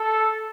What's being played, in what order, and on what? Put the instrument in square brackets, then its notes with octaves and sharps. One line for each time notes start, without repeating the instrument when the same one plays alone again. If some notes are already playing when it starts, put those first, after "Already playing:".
Already playing: [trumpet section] A4